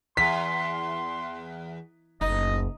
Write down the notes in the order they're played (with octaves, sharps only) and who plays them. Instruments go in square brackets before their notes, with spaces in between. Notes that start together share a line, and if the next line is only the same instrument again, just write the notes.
[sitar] E2 [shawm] C6 [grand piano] B6
[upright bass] F#1 D2 [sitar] D#4 [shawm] D#5